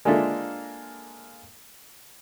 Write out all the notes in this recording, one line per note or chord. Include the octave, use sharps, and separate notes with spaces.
G#3 A#3 D4 F4 A4 E5